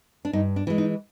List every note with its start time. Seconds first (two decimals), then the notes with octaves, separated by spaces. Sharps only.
0.25 D4
0.33 G2 D#4
0.56 D4
0.67 E3 G#3
0.78 D#4